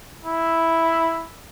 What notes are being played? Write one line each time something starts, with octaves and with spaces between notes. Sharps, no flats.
E4